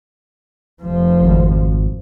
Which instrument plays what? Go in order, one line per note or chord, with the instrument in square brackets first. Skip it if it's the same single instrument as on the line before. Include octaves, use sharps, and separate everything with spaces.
[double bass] F1 F3
[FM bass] G#1